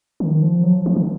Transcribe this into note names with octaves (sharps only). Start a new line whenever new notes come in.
D#3
F3
F#3
F3
F3
D#3